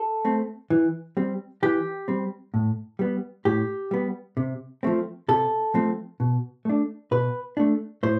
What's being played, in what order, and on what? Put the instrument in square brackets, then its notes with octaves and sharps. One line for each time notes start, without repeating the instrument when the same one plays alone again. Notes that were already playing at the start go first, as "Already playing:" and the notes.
Already playing: [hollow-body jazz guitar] A4
A3 C4
E3
G3 C4
E3 G4
G3 C4
A2
G3 B3
A2 G4
G3 B3
C3
F3 A3 C4
C3 A4
F3 A3 C4
B2
A3 D4
B2 B4
A3 D4
A2 C5